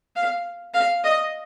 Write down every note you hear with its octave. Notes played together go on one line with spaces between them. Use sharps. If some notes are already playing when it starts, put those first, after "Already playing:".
F5
F5
D#5